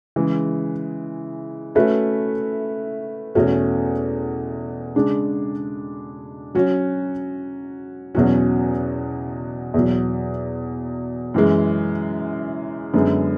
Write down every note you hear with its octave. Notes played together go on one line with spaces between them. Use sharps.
C#3 E3 G#3
A3 C#4 F#4 B4 E5
E2 B2 A3 C#4 F#4
C#3 G#3 D4
F#3 C#4 F#4
E2 B2 F#3 C#4 F#4
E2 B2 F#3
F#2 E3 G#3
F#2 D3 G#3 B3